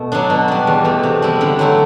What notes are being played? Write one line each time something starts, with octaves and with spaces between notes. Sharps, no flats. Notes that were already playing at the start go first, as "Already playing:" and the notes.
Already playing: B2 A3
F#3 B3 D4
B2
G3 D4
E2
B2 A3
C3
G3 B3 E4
D3
F#3 A3 E4